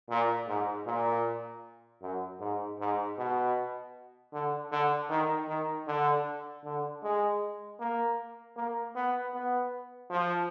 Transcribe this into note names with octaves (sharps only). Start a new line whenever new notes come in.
A#2
G#2
A#2
F#2
G#2
G#2
B2
D3
D3
D#3
D#3
D3
D3
G#3
A#3
A#3
B3
B3
F3